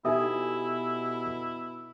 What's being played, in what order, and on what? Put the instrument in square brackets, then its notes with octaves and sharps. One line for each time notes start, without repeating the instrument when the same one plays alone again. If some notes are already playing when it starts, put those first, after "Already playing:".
[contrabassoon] B2 [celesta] D#4 E5 D#6 [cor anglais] E4 [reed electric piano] G4 A4 G#5